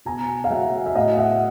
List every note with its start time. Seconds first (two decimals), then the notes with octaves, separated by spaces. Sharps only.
0.05 B2 G#5 A#5
0.44 F5
0.50 F#3 E5 F#5
0.86 E5
0.95 A2 D#5 F5
1.18 E5 F#5